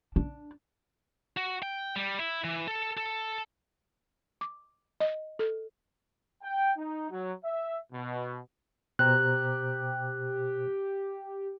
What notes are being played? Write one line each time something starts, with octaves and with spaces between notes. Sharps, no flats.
D4
F#4
G5
G3
E4
E3
A4
A4
D6
D#5
A4
G5
D#4
F#3
E5
B2
B2 G4 C5 A#5 F#6